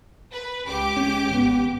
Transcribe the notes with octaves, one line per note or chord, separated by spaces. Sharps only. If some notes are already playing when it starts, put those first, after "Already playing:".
B4
C#2 G4 D6
C#4
G#1 B3